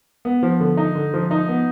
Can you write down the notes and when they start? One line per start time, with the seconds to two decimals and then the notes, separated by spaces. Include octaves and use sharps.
0.25 B3
0.43 F3
0.60 D3
0.77 D#4
0.95 D3
1.14 F3
1.31 D#4
1.49 B3